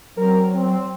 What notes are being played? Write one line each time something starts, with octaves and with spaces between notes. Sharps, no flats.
F#3 C4 A#4
C4